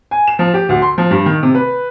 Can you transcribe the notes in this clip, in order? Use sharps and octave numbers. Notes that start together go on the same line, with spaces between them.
G#5
E7
F3
G4
D2
C6
F3
G2
D#3
C3
B4